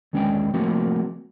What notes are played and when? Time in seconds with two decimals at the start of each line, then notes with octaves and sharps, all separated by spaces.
0.13 D#2 G#3 C#4 D4 C5 G5
0.54 F3 A3 A#3 C4 F#4